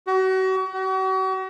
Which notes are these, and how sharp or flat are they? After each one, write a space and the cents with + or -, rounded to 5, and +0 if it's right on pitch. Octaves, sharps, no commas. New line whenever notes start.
F#4 +35
F#4 +40